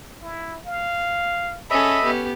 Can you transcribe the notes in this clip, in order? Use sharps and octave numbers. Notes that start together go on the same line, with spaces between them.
E4
F5
C#4 G#4 A4 D#5 E5 B5
B3 C#4 G4